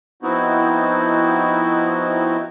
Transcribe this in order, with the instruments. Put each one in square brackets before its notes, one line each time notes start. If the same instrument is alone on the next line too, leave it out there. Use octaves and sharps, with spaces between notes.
[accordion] F3 B3 C4 D#4 E4 F#4